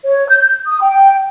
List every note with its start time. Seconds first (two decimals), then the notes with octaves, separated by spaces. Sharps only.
0.05 C#5
0.29 G6
0.67 D#6
0.81 G5